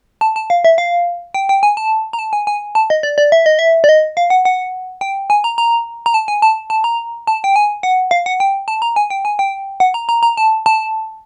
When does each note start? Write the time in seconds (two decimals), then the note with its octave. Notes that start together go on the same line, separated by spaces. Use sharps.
0.21 A5
0.36 A5
0.50 F5
0.65 E5
0.78 F5
1.34 G5
1.49 G5
1.63 G#5
1.77 A5
2.13 A#5
2.19 A5
2.33 G#5
2.47 G#5
2.75 A5
2.90 D#5
3.03 D5
3.18 D5
3.32 E5
3.46 D#5
3.59 E5
3.84 D5
3.89 D#5
4.17 F5
4.30 F#5
4.45 F#5
5.01 G5
5.30 G#5
5.44 A#5
5.58 A#5
6.06 A#5
6.14 A5
6.28 G#5
6.42 A5
6.70 A5
6.84 A#5
7.27 A5
7.44 G5
7.56 G#5
7.83 F#5
8.11 F5
8.26 F#5
8.40 G5
8.68 A5
8.82 A#5
8.96 G#5
9.10 G5
9.25 G#5
9.39 G5
9.80 F#5
9.94 A#5
10.09 A#5
10.23 A#5
10.37 A5
10.66 A5